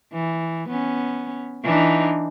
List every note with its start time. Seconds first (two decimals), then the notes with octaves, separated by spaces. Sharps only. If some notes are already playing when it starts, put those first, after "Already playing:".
0.12 E3
0.69 B3 C#4
1.64 E3 D4 D#4